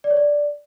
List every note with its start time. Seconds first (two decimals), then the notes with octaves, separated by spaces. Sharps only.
0.04 D5
0.11 C#5
0.17 D5